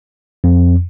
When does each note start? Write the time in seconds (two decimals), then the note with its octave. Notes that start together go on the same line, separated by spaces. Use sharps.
0.44 F2